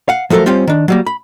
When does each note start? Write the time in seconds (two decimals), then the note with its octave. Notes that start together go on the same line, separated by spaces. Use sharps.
0.09 F5 F#5
0.30 F3 F#3 A3 A4 A#4
0.46 G3 C4 C#4 F4 G4
0.67 D#3 D4
0.88 F#3 G3 A#3
1.07 B5